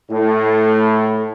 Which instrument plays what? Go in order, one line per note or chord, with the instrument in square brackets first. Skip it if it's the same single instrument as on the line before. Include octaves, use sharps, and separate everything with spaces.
[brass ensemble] A2